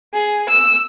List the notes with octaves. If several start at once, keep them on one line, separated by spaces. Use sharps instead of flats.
G#4
E6